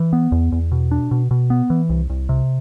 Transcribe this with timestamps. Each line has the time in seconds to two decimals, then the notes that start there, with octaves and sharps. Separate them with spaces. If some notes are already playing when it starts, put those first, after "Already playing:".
Already playing: E3
0.13 B3
0.32 E2
0.52 E2
0.72 B2
0.91 D4
1.11 B2
1.31 B2
1.50 B3
1.70 E3
1.89 C2
2.10 C2
2.29 C3